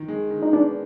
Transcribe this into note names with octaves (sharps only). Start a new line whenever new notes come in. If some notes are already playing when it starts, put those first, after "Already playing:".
Already playing: D#3
G#3
D#3
D#4
B3 D4